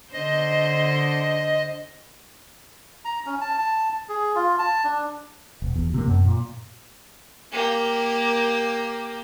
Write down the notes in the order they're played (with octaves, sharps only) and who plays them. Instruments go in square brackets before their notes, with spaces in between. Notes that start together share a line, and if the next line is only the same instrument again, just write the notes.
[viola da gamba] D3 C5 [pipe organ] D#5
[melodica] A#5
C#4
A5
A5
G#4
F4
A5
D4
[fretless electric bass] E1
E2
C3 A#3
F#2
A#2
[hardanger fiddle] A#3 G4